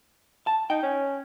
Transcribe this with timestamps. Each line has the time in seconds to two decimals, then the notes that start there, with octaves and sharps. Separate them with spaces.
0.47 A5
0.70 D#4 G5
0.83 C#4